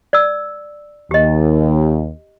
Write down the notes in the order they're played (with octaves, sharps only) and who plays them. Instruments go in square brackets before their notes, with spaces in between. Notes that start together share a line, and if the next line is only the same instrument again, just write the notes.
[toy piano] D5 E6
[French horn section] D#2 [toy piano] G4 D#5